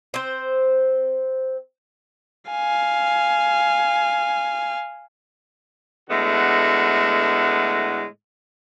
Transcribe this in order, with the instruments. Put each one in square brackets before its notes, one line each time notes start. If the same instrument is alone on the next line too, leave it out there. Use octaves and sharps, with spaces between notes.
[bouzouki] C4 C5
[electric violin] F5 G#5
[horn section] A2 D3 G#3 A3 B3 F#4